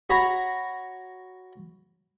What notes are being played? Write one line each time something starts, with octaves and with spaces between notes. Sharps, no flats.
F#4 C#5 A#5 B5